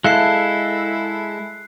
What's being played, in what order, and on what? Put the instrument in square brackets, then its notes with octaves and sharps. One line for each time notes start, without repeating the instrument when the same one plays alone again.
[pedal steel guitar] G#3 A4 [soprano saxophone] E4 [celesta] E5 F5 A5 [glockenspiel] F#6 C7